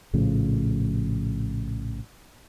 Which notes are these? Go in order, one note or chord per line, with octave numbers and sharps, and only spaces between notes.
A#1 A2 C#3 F3